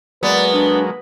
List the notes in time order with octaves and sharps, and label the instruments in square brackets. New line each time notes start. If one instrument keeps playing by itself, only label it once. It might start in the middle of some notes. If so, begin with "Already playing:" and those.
[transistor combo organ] F#3 G#3 A#3 [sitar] B3 [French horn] B4 [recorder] D5
[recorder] D4